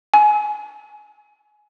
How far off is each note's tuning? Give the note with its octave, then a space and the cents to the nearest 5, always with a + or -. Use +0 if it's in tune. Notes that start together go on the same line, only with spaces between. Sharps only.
G#5 +20